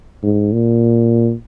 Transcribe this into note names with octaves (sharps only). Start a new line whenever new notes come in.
G#2
A#2